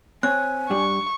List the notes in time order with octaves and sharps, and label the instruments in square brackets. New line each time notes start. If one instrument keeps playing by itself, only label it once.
[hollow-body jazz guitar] C4 C#5 [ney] G#5 [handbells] F#6
[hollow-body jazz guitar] G2 G3 D4 [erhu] C#6